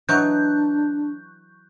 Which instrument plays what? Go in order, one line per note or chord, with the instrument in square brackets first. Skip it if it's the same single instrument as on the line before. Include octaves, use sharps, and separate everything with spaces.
[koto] E3 F#3 D#4 [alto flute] D4 [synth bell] C#6 F#6 G6